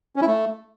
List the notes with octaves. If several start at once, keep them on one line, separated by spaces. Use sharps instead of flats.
C#4
E4
A3